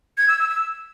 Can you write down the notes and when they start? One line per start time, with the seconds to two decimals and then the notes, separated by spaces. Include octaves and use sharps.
0.18 G#6
0.28 E6
0.39 E6
0.50 E6